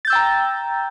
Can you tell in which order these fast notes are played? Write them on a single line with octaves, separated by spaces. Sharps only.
A6 G6 E6 G5 A#5